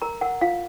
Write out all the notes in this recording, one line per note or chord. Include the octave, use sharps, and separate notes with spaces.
A#4 A#5
A#4 F#5
F4 F5